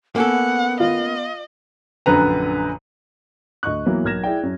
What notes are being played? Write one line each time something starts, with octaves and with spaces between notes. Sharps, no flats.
A#3 B3 C#4 A4 F#5
F4 D#5
A#1 F#2 D3 B4 A#5
D2 D#5 C#6 F#6
E3 F#3 A#3 B3
B1 A#4 F6 G#6 A#6 E7
E4 G#4 D5 G5
F#2